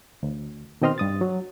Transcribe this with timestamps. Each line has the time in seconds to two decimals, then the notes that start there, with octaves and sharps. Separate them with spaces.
0.23 D2
0.82 B2 D#3 C4 D#5 C6 F6
0.98 G2 D#6 A6
1.21 F#3